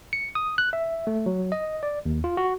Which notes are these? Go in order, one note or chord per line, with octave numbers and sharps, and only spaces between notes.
C#7
D#6
F#6
E5
A3
F#3
D#5
D5
D#2
F4
F#4